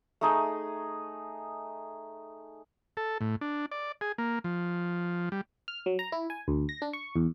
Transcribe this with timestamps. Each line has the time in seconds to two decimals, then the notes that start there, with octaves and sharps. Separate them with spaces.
0.21 A3 D#4 G#4
2.97 A4
3.21 A2
3.41 D4
3.71 D5
4.01 G#4
4.18 A#3
4.44 F3
5.32 G3
5.68 F6
5.86 F#3
5.99 A#5
6.12 E4
6.30 G#5
6.48 D2
6.69 A#6
6.82 D4
6.93 C#6
7.16 E2